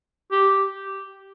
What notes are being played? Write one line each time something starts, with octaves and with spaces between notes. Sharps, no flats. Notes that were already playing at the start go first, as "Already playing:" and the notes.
G4